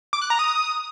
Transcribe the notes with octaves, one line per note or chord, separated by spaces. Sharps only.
D6
F#6
A#5
D#6